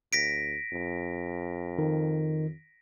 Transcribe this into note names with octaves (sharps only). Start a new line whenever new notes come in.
D2 A#6 B6 D7
F2
D#3